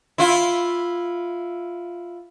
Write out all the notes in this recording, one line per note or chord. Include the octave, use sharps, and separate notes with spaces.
E4 F4